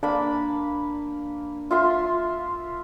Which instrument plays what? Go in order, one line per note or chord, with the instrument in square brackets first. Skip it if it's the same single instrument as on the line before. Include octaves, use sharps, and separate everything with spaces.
[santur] A#3 B5 [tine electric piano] D4
[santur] F4 E5 C6